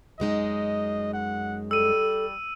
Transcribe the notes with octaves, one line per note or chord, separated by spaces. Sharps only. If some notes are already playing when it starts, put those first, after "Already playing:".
F#2 G#3 D#4 D#5
F#5
G3 A4 E6 D#7